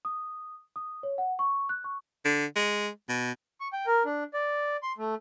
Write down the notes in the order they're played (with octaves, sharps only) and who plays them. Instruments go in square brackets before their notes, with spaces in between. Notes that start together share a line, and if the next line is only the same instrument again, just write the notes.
[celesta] D#6
D#6
C#5
F#5
C#6
F#6
C#6
[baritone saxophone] D3
G#3
B2
[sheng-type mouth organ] C#6
G5
A#4
D4
D5
C6
A3